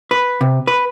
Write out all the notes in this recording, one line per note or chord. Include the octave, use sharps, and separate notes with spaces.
B4
C3
B4